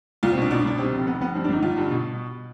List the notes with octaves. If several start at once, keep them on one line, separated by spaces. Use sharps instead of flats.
C2 F4
C4
B2 D4
B2 D4
C2 D4
C3 C4
F1
F1 B3
F1 B3
G2 C4
D4
G1 D#4
G1 F4
G2
B2